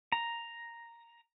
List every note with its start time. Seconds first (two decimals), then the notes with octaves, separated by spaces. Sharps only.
0.12 A#5